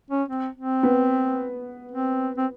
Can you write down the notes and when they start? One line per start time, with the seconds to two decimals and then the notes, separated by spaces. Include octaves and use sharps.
0.10 C#4
0.29 C4
0.56 C4
0.83 B3
1.92 C4
2.37 C4